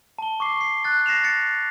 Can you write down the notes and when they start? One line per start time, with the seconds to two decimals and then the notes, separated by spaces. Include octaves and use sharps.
0.18 A5 G7
0.40 C#6 D6 C7
0.61 C7
0.84 F#6 A6
1.06 A#6 C7 E7 F7
1.24 A6 C#7